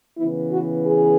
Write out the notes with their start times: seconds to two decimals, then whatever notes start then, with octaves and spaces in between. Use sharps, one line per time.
0.18 C#3 E3 B3 E4
0.52 F#4
0.85 G#4